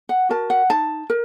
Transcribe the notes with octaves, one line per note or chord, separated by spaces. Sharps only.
F#5
F#4 A#4 A5
F#5
D#4 A5
A#4